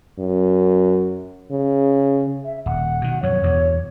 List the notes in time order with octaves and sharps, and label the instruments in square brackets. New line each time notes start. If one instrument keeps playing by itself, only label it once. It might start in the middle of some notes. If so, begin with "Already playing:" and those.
[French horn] F#2
C#3
[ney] E5
[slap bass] D#1 [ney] F#5
[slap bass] B2 D#3
[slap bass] F#2 B2 F3 [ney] C#5
[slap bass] E2 G2 B2